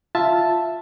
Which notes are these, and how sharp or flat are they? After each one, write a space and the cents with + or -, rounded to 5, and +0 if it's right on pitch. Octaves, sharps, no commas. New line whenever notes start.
F4 +0 E5 +0 A5 +0